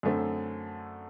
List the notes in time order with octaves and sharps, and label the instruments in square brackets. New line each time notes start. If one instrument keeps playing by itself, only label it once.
[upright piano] F#2 D3 A3 C4